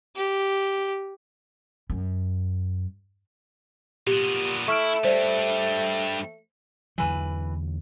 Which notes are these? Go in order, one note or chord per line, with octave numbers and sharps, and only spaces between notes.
G4
F#2
A#2 B3 G4 D#7
A3 E4 C#6 F6 D7
G2 G3 C5 D5
E2 D3 E3 F#3 B4